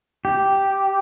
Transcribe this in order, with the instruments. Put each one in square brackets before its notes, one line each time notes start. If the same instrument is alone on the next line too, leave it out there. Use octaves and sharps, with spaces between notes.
[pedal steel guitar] G4